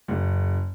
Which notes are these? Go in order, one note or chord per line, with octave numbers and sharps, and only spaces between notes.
F#1